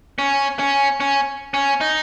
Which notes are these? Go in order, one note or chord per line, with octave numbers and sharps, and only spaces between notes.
C#4
C#4
C#4
C#4
D#4